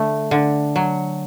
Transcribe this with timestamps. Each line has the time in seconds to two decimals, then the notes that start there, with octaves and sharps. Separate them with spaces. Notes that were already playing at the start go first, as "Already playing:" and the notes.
Already playing: D3 A3
0.31 D3
0.76 F#3